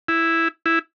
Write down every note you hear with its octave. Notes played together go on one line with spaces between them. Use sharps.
E4
E4